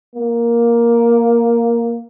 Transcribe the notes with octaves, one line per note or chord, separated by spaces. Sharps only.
A#3